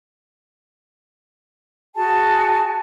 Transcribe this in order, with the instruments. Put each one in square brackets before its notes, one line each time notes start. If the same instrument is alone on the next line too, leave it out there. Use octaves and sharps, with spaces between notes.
[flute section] F#4 G#4 G#5 A5